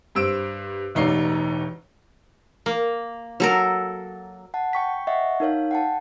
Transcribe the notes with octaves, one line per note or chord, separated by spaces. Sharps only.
G2 C5 E6 D7
E1 A1 D#4 C#5 D5 C7
A#3
F#3 A4 A#4
F#5 A5
G5 C#6 B6
D#5 E5 F#5 C#6
D#4 A#4 C#5 F5
F#5 G5 A5